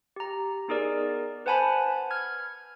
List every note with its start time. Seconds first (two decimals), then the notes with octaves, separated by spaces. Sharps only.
0.16 G4 A#5
0.68 B3 D#4 G#4 A#4 D5
1.46 B4 C5 F#5 G#5 A5 B5
2.11 F6 G#6